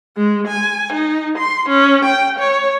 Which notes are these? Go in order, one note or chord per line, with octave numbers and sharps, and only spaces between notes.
G#3
G#5
D#4
C6
C#4
G5
C#5